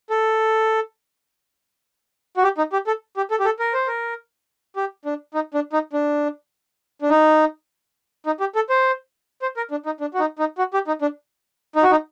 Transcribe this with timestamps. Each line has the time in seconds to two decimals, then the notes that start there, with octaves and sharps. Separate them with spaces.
0.10 A4
2.37 F#4
2.43 G4
2.58 D#4
2.73 G4
2.87 A4
3.17 G4
3.31 A4
3.40 G4
3.45 A4
3.59 A#4
3.73 C5
3.87 A#4
4.76 G4
5.05 D4
5.34 D#4
5.54 D4
5.73 D#4
5.93 D4
7.02 D4
7.10 D#4
8.26 D#4
8.40 G4
8.55 A4
8.70 C5
9.42 C5
9.57 A#4
9.71 D4
9.86 D#4
10.00 D4
10.14 F#4
10.20 D#4
10.39 D#4
10.58 F#4
10.74 G4
10.87 D#4
11.02 D4
11.76 D#4
11.83 F#4
11.91 D#4